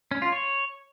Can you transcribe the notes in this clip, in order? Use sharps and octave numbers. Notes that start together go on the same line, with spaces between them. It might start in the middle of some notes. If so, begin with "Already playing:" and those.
C#4
F4
C#5